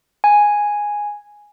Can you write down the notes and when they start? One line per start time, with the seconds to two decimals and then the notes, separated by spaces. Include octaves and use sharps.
0.24 G#5